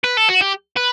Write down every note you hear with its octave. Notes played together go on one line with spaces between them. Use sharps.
B4
A4
F#4
G4
B4